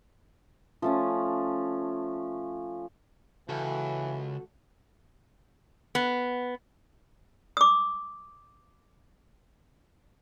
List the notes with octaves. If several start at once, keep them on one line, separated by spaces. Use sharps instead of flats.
F3 A3 C#4
C#2 E3 F#4 A4
B3
D6 D#6